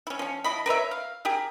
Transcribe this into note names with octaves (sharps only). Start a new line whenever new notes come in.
C#4 E4
F3 C#4
F3 E4 D#5 B5
A#4 B4 C#5 E5
F5
G4 G#4 A#4